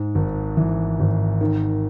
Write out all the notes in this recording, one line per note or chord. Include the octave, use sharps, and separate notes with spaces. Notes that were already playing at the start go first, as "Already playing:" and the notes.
Already playing: G#2
G#1
E3
G#1
D#3